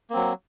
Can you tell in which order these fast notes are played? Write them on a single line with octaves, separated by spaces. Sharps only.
A#3 C4 F#3